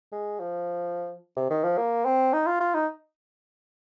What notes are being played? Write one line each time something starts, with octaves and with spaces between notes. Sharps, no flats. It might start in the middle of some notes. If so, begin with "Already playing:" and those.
G#3
F3
C3
D#3
F3
A#3
C4
D#4
F4
F4
D#4